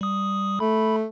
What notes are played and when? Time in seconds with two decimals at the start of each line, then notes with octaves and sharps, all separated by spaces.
0.01 G3 D#6
0.60 A3 B5